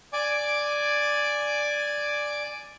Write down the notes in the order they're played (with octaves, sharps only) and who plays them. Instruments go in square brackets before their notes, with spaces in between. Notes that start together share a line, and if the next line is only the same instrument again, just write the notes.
[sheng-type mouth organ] D5 G#5 D6